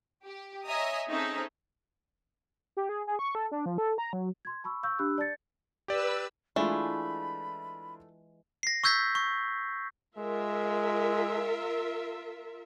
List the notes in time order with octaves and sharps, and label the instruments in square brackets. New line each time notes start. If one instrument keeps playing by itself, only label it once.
[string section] G4
C#5 D#5 E5 G#5 A#5 D#6
C4 C#4 D#4 G#4 A4 E5
[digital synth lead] G4
G#4
G#4
C#6
A4
D4
F3
A4
A#5
F#3
[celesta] C6 G#6
A5 B5 C#6 E6
F5 C#6 E6 G6
D4 G4 B5 E6 F#6
D5 A5 G6 A6 C#7
[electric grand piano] G4 D5 [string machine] B4 E6
[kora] E3 G#3 [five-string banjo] A3 [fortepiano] D4 E4 F4 [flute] B5
[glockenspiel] A#6 C7
C#6 E6 G6 G#6 B6
C#6
[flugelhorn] G#3 [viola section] F4 A#4 E5